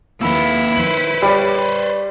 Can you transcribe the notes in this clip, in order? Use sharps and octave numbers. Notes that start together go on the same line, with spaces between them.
D#2 A#3 E4 B4 B5 E6
D#3 B4 C5 F#7
G3 C#5 D5 G5